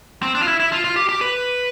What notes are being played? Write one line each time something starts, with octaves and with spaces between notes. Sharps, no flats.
C4
D4
F4
E4
E4
F4
F4
G4
G4
B4